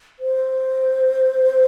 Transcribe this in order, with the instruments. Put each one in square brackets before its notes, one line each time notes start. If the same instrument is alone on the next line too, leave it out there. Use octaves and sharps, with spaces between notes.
[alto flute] C5